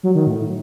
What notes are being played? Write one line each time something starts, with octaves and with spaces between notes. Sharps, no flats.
F#3
D#3
A2